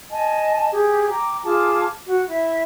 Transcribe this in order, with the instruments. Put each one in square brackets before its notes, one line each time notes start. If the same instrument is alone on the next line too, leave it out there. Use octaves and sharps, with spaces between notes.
[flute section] D#5 G#5 A5
G4 G#4
G5 A#5 D6
F4 G#4 A5 D6
F#4
E4 E5